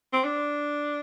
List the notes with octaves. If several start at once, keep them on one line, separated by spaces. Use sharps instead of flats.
C4
D4